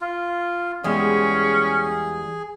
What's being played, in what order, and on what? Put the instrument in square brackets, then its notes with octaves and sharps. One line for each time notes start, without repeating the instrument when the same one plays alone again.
[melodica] F4
[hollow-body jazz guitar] E2 G3 G#3 [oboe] C#4 [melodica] G#4